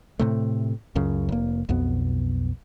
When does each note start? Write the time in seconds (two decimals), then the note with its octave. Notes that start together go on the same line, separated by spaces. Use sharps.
0.19 A2 C3 A3
0.95 C#2 F#2 C#3
1.29 F1 A#3
1.69 B1 F2 B2 B3